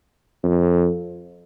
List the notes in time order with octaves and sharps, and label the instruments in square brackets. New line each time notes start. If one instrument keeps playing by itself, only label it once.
[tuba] F2